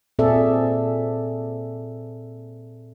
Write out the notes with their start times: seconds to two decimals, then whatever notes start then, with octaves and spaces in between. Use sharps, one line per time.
0.19 A#2 C4 G#4 A4 D5 E5